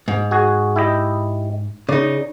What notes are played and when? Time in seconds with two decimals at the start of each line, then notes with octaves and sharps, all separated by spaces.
0.08 G#2
0.31 F#4 G#4
0.76 E4 G4 D#5
1.89 C#3 D#4 D5